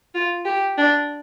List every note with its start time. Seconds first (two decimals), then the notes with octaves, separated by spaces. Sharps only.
0.14 F4
0.45 G4
0.78 D4